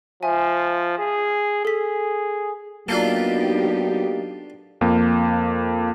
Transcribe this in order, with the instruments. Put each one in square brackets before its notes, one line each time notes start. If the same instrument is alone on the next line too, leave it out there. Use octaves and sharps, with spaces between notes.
[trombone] F3 [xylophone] E5 G#5
[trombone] G#4
[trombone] G#4 [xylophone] A4 B6
[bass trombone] F#3 [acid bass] A#3 [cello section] B3 D#4 G4 [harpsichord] D4 F4 A4
[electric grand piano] F2 A#3